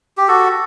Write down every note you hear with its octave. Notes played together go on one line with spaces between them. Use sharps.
G4
F#4 A4